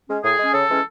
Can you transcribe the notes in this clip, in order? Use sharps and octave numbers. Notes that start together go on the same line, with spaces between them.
G#3 C#4
A2 G#4
G#3 C#4
C#3 A4
E3 G#3 C#4